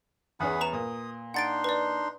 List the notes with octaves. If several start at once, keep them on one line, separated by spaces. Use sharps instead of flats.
E2 B3 C#4 G#4 F#5 B5
B4 A#5 E7
A#2 D#6
D4 D#4 F#5 C6 A6 D7
B4 D5